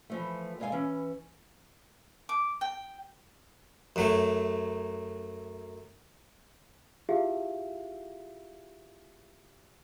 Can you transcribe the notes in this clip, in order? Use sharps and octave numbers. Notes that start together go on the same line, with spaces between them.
E3 F3 A3
G2 G#3 A4 F5 G#5
E3 C#4
D6
G5
F#2 F#3 A3
E4 F4 G4 G#4 E5 F5